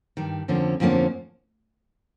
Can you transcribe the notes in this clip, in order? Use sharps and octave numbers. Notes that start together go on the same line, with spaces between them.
G2 D#3 G3
F2 D3 F3 A#3 C#4
F2 D3 F3 A#3 C#4